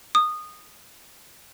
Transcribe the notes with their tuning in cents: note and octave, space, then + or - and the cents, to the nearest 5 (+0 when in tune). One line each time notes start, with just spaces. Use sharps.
D#6 -20